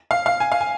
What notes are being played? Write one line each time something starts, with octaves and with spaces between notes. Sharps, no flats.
F5
F5
G#5
F5
G#5